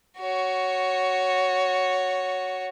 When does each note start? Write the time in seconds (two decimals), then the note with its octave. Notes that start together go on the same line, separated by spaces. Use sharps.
0.18 F#4 C#5